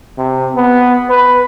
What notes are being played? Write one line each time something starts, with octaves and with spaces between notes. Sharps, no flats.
C3
B3
B4